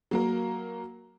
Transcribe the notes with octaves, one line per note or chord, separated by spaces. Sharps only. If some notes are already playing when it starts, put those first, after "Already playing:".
F#3 A#3 A#4